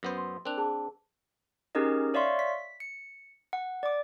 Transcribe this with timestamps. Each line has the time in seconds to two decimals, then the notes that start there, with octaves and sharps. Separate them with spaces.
0.03 F#2 B3 C5
0.17 C6
0.45 C4 D4 A#4 F#6 F7
0.57 G#4 A5
1.75 C#4 D#4 G4 G#4 A#4 D#5
2.14 C#5 D5 E5 F5 C6 C#6
2.39 B6
2.80 C#7
3.53 F#5
3.83 D5 D6